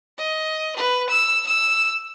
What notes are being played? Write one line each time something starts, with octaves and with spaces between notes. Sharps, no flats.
D#5
B4
E6
E6